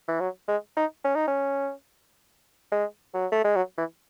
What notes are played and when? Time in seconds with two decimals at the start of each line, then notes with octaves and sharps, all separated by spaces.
0.08 E3
0.20 F#3
0.48 G#3
0.77 D#4
1.04 C#4
1.15 D#4
1.27 C#4
2.72 G#3
3.14 F#3
3.32 A3
3.44 G#3
3.56 F#3
3.78 E3